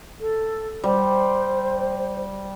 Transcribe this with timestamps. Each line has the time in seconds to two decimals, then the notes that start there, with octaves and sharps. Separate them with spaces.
0.19 A4
0.84 G3 C5